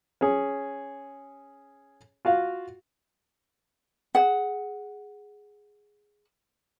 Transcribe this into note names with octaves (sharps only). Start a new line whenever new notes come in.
C#4 G#4
F4 F#4 F5
G#4 F#5